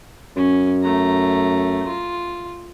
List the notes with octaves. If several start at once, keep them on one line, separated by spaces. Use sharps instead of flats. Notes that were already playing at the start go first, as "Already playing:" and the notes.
F#2 C#4
A3 A#5
F4